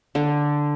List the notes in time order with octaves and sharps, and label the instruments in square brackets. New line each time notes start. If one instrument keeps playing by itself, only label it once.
[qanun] D3